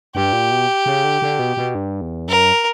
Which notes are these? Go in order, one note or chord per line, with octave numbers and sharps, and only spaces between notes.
G2 G4
A#2
B2
C#3
D3
D3
B2
B2
G2
E2
F#2 A#4